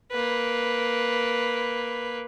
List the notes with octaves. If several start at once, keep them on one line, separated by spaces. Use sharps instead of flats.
A#3 B4